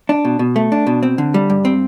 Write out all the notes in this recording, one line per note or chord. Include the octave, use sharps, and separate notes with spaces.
D4
B2
B2
A3
D4
B2
C4
D3
G3
G2
C4